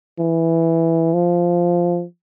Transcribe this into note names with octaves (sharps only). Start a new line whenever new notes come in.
E3
F3